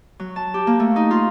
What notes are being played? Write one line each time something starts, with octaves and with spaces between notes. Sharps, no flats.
F#3
A5
G4
A#3
A3
D#4
F4